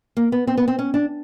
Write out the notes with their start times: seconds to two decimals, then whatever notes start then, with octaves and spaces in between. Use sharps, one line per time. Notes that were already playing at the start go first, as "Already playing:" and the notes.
0.17 A#3
0.32 B3
0.47 C4
0.57 B3
0.68 C4
0.79 C#4
0.94 D4